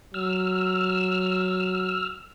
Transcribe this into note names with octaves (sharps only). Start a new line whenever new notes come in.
F#3 E6 F6